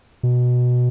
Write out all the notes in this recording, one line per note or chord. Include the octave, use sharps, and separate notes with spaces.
B2